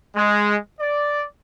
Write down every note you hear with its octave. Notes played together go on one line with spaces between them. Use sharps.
G#3
D5